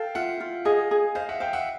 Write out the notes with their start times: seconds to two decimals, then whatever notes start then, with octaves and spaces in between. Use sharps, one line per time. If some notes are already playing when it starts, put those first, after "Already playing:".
Already playing: A4 F5 G5
0.15 F4 E5 F#5
0.40 F4
0.65 G#4 D#5 F5
0.91 G#4
1.15 C5 D#5 F5
1.29 E5 F#5
1.40 C5 F5 G5
1.53 E5 F#5